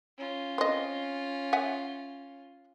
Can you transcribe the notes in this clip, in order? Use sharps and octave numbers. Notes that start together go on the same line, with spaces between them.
C#4 F4
C4 D#5
E5 F#5 G#5